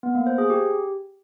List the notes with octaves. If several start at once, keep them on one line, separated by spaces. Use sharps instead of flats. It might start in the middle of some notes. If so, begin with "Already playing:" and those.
B3
A#3
C5
G#4
G4